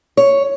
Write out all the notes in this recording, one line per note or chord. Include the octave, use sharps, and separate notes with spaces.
C#5